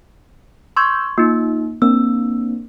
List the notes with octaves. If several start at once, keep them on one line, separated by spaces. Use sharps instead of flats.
C6 C#6 E6 G6 G#6
A#3 D#4 F4
A#3 C4 D4 E6